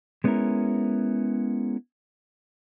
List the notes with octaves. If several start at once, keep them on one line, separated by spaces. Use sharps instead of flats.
G#3 B3 C#4 D4 E4 A#4